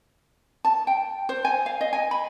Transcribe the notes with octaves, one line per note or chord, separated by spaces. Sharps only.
A5
G5
C5
G#5
F5
D#5
G#5
B5